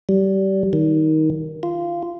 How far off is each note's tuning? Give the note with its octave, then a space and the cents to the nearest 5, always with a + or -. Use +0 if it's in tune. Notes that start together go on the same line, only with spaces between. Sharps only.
G3 -25
D#3 +15
F4 -15